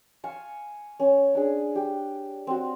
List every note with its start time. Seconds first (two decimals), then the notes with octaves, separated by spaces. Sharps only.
0.24 F5 G#5 A5 C#6
1.00 C#4
1.35 D4 G#4
1.75 G4
2.47 C4 F#4